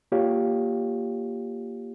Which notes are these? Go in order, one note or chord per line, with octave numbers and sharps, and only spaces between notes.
A#3 F4 G4 C#5 F5